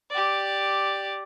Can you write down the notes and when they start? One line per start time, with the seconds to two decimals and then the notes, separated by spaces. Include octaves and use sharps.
0.10 G4 D5